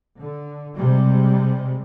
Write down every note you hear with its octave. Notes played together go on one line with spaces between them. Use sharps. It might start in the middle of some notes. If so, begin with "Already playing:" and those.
D3
C3 G3 G#3